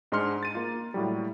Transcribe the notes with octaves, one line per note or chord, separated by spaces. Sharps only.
G#2 G#3 D4 C6 F6 C#7
A6 D#7
A#3 F4
A2 F#3 G3